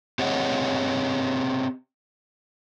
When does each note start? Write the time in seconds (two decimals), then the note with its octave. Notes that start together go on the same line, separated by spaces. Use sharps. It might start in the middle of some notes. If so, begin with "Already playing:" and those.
0.19 C4 G4 G#4 C#5 D#5 F#5